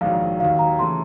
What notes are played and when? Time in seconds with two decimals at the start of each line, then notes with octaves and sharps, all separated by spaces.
0.01 A#1 G#2 D#3 F#3 F5
0.40 D#2 D#3 F#3 F5
0.59 A#5
0.78 C#3 E3 A3 C6